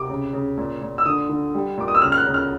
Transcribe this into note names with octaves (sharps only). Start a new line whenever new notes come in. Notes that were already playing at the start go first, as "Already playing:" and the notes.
Already playing: C3 D6
C#3
C#3
A#2
A#2
E6
D3 D#6
D3
G3
A#2 D6
D#6
E6
C#3 F6
F6
F#6
C#3
F6